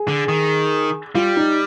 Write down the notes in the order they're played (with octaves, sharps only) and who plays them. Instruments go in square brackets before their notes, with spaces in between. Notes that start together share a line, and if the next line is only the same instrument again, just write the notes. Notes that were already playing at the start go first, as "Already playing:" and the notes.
Already playing: [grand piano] G#4
[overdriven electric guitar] D3
D#3
[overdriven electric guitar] G3 [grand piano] F4
[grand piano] D#4